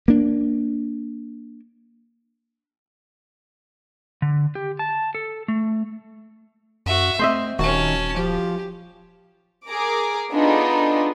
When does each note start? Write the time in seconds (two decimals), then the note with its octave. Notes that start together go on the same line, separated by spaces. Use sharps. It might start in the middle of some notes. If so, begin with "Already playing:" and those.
0.08 A#3 D4
4.22 D3
4.55 G4
4.79 A5
5.15 A4
5.48 A3
6.86 F#2 F#4 E5
7.19 A3 C4 C5 D#5 E5
7.59 D#1 D#3 C#4 F#4 A5
8.17 F3 G4
9.68 G#4 A#4 A#5 D6
10.32 B3 D4 D#4 F4 G#4 A4